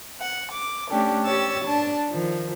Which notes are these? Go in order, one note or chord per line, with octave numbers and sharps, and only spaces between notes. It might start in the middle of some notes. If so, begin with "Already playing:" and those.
F#5
D6
A3 C#4 D4 G4 A4
G4 C#5 E6 A6
D4 A5
D#3 F3